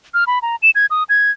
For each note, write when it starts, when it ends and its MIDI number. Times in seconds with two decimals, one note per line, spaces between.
0.14 0.24 89
0.27 0.39 83
0.42 0.56 82
0.63 0.70 100
0.75 0.86 92
0.91 1.04 87
1.09 1.31 92